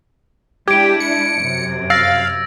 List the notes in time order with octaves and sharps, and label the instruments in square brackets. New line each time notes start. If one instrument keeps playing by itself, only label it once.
[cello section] G#3 D4 E4 [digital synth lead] G4 [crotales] G#6 D7
[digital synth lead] C#7
[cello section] F#2 C3
[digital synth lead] F5 [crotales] E6 A6 A#6